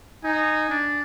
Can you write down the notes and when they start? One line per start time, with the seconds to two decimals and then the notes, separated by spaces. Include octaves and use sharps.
0.24 D#4 G#5
0.70 D4